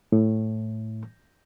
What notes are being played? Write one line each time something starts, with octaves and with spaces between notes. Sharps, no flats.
A2